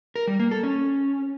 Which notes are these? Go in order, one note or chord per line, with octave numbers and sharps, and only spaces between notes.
A#4
G3
A#3
A4
C#4